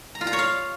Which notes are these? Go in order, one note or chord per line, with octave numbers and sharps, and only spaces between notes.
A#5
F4
A#5
C#5
F5